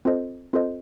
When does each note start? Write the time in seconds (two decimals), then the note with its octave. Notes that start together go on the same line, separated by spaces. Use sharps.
0.05 C4 F4 A4 C5 D#5
0.53 C4 F4 A4 C5 D#5